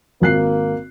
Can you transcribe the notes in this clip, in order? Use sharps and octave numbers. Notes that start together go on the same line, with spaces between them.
G#1 A#3 F#6 C7